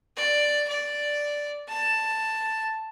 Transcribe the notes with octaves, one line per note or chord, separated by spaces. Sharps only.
D5
D5
A5